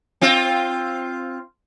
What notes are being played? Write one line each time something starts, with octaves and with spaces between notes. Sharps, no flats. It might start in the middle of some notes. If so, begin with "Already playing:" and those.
C4 F4